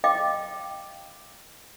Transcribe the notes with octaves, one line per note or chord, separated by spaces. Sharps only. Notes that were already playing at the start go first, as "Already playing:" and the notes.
D#5 F5 G5 D6